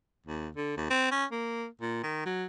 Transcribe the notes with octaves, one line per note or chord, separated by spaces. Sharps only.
D#2
D3
D#2
C4
C#4
A#3
A#2
D#3
F#3